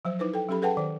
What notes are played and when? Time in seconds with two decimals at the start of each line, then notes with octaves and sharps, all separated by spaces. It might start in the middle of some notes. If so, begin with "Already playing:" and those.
0.05 F3 F#3 C5
0.19 D#4 E4 B4 C5
0.34 A4 G5
0.49 F#3 C#4 G4 A4 B5
0.62 G#4 A4 B4 F#5 G5 A5
0.77 D#3 C5